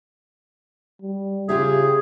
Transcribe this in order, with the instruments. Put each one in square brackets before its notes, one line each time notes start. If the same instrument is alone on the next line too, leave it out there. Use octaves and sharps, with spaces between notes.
[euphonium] G3
[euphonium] C#3 [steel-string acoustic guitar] F4 G4 E5 [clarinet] G#4